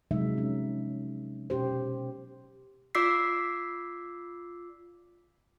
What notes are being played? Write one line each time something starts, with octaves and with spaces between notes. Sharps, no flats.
C3 F3 F#3 G#3 D#4 E5
C#4
B2 C#4 G4 C5
F4 D5 D6 E6 B6 C7